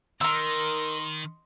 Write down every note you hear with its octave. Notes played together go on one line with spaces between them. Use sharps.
D#3 A#4 D#5 C6 E6